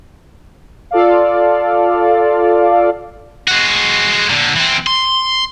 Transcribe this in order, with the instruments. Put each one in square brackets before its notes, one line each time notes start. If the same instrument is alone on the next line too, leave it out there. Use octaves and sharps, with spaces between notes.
[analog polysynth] F4 A4 D5 F5
[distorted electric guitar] G#3 F#4
A#2 D3
E3 C4
C6